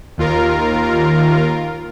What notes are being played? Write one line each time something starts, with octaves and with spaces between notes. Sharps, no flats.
D#2 F4 A#4